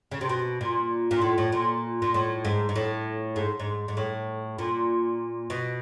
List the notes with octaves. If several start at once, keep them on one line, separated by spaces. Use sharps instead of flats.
C#3
C3
B2
A#2
A#2
A2
A2
A#2
A#2
A2
G#2
G#2
A2
G#2
G#2
G#2
A2
A#2
B2